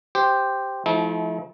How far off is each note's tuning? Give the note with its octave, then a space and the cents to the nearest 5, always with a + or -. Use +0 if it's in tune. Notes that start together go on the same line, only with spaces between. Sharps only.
G4 +0 C5 +0
F3 -20 A3 -40 E4 -45